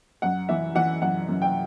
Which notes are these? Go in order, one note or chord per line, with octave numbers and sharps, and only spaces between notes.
F#2 F#5
E3 E5
E3 F#5
F#2 F#5
F#2
G5